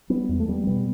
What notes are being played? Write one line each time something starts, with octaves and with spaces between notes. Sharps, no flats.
G3 B3
E2
A3
G3 B3
B2 G3 B3